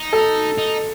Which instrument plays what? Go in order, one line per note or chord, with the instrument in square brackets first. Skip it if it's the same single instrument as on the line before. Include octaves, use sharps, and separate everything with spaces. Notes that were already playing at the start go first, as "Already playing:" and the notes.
Already playing: [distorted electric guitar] D#4
[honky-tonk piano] A4
[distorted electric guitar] D#4